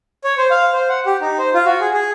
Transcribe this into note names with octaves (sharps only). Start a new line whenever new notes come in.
C#5
C5
F5
C5
F#5
G4
D#4
C5
F4
F#4
G#4
G#4